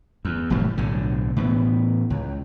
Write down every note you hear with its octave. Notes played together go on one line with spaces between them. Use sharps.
E2
F1 A2 E3 G3
B1 A2 D3
A2 E3 B3
C#2